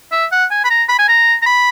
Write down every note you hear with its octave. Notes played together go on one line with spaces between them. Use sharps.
E5
F#5
G#5
B5
A#5
B5
G#5
A#5
A#5
B5